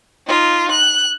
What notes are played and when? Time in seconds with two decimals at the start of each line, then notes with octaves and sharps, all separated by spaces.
0.27 D#4 F4
0.71 F#6